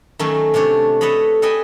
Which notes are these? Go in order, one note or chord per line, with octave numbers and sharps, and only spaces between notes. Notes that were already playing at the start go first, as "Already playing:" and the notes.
D#3 F#3 A3 C#4
C3 A3 D4 C#5
A4 B4 C#5 D#5 B5
A4 B4 D#5 G5 G#5